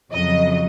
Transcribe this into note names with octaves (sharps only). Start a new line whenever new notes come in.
F2 C#3 F#3 D#5